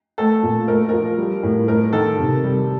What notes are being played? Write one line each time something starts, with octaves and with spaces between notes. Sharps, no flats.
A3 A4
A#2
A3 A#4
F3 A#4
G3
A2
A3 A#4
D#3 A4
C3
G3